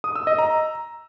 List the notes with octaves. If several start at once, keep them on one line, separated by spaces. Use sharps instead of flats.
D#6
E6
D#5
A#5